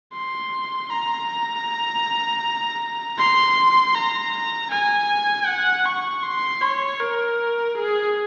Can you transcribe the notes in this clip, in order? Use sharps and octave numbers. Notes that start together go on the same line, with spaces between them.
C6
A#5
C6
A#5
G#5
F#5
C#6
C6
C#5
A#4
G#4